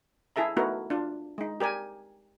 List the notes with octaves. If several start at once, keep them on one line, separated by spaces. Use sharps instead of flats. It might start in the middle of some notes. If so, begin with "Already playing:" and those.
E4 G#4 A4 E5 A#5
A3 B3 D#4 E4 F#4 A#4
D4 F4
G#3 D#4
G4 A#4 D5 G#5